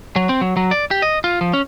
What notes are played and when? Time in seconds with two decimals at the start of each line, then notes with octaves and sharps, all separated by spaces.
0.16 F#3
0.29 C4
0.41 F#3
0.57 F#3
0.71 D5
0.91 G4
1.02 D#5
1.24 F4
1.41 F3
1.53 C#4